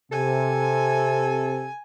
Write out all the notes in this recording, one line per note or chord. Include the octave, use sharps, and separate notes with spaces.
C3 A4 G#5